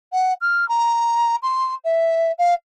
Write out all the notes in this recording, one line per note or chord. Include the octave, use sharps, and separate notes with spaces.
F#5
F6
A#5
C6
E5
F5